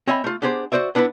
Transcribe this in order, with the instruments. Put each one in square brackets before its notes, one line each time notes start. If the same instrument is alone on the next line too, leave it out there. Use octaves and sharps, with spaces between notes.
[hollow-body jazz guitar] C4 C#5 D#5 E5 G#5 B5
A3 F4
B3 D4 G4 G#4 C5
F#4 G4 C5 D5 E5
B3 D4 E4 A#4 B4